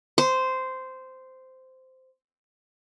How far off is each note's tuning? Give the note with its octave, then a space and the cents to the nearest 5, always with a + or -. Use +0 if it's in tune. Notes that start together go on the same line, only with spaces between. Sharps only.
C5 -10